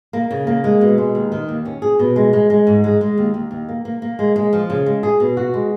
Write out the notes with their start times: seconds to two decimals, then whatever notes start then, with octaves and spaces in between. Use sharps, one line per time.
0.13 A#3
0.31 C#3
0.47 A#3
0.64 G#3
0.81 B2
0.98 G#3
1.15 D#2
1.32 D#3
1.49 D#2
1.65 C#4
1.82 G#4
1.99 B2
2.16 G#3
2.33 G#3
2.50 G#3
2.67 G#2
2.84 G#3
3.01 G#3
3.18 D#2
3.34 D#2
3.51 D#2
3.69 A#3
3.85 A#3
4.02 A#3
4.19 G#3
4.36 G#3
4.53 F3
4.70 C#3
4.86 G#3
5.03 G#4
5.20 B2
5.37 F#4
5.54 G#3